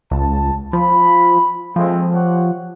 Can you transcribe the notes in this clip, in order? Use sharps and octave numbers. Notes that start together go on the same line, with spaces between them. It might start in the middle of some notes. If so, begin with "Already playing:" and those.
C#2 A5
F3 B5
F3 G#3 A3 C4
G4 C#5 F#5